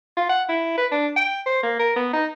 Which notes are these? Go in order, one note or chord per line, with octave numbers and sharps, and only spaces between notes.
F4
F#5
E4
B4
D4
G5
C5
A#3
A#4
B3
D#4